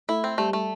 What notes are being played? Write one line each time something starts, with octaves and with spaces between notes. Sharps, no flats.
A3 E4
C4
G3 A3
A3